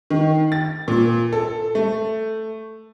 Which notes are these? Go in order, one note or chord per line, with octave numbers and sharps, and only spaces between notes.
D#3
A6
A#2
A4
A3